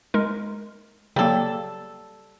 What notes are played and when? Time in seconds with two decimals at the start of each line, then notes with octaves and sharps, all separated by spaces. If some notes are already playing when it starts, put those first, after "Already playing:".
0.14 G#3 D#4 A#4
1.16 C#3 F#3 G3 A#3 A4